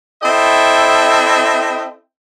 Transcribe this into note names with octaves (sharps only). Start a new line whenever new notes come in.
C4 E4 A4 D#5 E5 G5